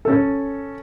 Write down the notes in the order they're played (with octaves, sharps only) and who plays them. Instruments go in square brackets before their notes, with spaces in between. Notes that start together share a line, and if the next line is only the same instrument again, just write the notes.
[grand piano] C#4 A4